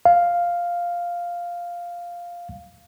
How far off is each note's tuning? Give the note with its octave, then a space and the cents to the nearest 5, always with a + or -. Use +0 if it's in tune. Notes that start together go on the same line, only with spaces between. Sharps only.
F5 +0